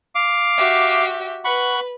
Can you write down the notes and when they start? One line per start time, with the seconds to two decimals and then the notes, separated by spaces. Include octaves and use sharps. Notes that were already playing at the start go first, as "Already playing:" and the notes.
0.15 F5 D6
0.57 F#4 G4 E5
1.45 B4 F#5 B5 C#6